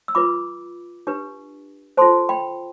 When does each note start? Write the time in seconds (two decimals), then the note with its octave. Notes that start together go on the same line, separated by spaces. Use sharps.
0.08 E6
0.15 F4 B4 B5 D6
1.07 D4 G4 B4
1.97 F4 A4 C5 A5 C6
2.29 G5 B5